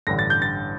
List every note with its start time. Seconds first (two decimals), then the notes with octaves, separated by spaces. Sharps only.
0.07 A1 G2 D3 A#6
0.19 A6
0.30 G6
0.42 A6